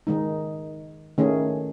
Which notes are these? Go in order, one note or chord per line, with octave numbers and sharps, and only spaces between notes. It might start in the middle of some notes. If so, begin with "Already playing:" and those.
D#3 G#3 D#4
D#3 A3 C#4 G#4